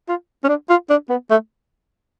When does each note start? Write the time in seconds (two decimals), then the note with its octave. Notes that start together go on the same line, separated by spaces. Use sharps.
0.08 F4
0.44 C#4
0.48 D4
0.69 F4
0.90 D4
1.10 B3
1.30 A3